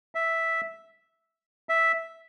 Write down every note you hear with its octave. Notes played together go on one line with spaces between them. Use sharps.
E5
E5